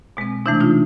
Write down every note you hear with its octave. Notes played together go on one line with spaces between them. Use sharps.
B2 G#3 C4
C3 E3 A3 D4 E4
D#4 F4